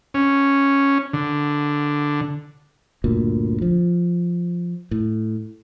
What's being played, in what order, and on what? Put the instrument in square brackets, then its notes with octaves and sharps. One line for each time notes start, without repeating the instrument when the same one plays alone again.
[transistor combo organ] C#4
D3
[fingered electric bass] G1 D2 A#2
F3
A2